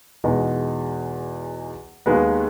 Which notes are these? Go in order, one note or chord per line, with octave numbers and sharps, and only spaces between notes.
E2 B2 G#3 D#4
D#2 D#3 G#3 B3